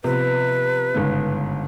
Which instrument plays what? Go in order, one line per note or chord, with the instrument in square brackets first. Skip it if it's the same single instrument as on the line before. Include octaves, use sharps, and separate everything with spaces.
[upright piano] C3 F3 B3 [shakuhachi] B4
[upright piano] G1 G#2 C#3